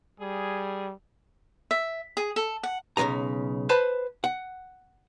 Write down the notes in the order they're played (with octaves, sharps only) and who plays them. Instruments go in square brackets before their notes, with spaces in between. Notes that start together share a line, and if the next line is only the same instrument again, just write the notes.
[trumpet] G3 [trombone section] G#4
[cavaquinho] E5
G#4
A4
F#5
[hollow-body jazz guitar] B1 C#3 A3 D#5 A#5
B4 C5 A5 B5
F#5